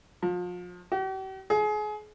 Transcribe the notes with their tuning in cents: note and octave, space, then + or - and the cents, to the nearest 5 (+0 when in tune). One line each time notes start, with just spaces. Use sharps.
F3 +30
G4 -45
G#4 +30